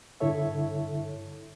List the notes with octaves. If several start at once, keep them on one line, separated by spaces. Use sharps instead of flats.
G2 D3 E4 A4 C#5 E5